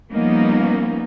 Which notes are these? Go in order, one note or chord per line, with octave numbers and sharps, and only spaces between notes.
F3 G3 A#3 B3 C#4 D#4